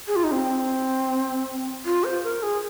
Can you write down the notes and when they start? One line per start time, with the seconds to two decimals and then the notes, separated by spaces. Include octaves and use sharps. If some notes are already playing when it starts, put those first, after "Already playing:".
0.08 G#4
0.16 F4
0.24 D#4
0.32 C4
1.86 F4
2.04 C5
2.23 A#4
2.43 G#4